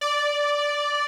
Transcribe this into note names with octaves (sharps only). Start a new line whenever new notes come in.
D5